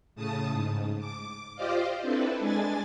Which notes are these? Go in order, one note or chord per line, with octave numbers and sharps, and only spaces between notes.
A2 C#3 A5 D#6
G#2
D6
F4 G4 C5 D5 D#5 F5
C4 D4 E4 A4 B4
G#3 D4 G#5 A6